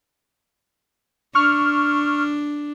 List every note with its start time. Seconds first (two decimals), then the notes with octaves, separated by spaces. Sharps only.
1.35 D4 C#6 F6